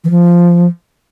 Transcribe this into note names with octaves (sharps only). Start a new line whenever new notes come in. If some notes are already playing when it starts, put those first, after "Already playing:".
E3
F3